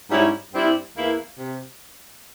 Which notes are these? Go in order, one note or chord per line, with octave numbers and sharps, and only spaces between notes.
G#2 G3 C#4 E4
G2 G3 C4 E4
E2 E3 A#3 E4
C3